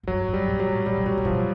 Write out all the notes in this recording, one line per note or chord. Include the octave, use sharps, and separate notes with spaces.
G#2
G2 F#3
G#2
G3
A#2
F#3
A2
A#2 G3
B2
A#2 F#3
A#2
B2 F3